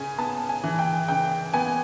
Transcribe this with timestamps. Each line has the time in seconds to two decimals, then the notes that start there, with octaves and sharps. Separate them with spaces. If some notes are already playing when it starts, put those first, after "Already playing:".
Already playing: C#3 G#5
0.18 B3 A5
0.49 G#5
0.64 E3
0.79 G5
1.08 C#3 G5
1.54 B3 G#5